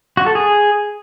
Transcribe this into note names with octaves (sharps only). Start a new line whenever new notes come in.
F#4
A4
G#4